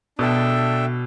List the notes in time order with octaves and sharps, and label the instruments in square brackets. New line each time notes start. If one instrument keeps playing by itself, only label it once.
[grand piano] B2 [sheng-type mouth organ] D4 A4 E5 G5